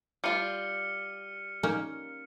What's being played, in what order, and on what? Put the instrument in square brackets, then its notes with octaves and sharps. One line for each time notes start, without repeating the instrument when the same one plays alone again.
[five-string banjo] G3 F4 [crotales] F6 C#7 D#7
[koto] A#3 C#4 D#4